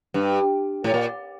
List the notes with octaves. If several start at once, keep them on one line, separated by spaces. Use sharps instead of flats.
G2
A2
A#2